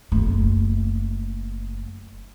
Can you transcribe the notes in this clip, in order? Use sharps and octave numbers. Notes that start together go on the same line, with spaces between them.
F#1 A3